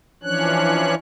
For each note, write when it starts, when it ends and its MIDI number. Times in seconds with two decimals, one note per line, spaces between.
0.23 0.95 52
0.23 0.95 53
0.23 0.95 61
0.23 0.95 62
0.23 0.95 73
0.23 0.95 90